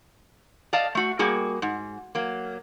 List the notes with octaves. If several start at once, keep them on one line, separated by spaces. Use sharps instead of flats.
D5 D#5 F5 A5
A3 F#4
G3 A#3 F#4 G#4
G#2
F#3 A#3